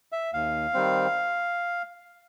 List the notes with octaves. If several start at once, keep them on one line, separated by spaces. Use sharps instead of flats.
E5
D#2 F5
D#3 G3 C4